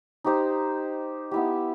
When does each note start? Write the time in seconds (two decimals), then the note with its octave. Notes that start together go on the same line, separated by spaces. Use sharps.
0.24 D#4 G4 C5
1.31 B3 E4 G4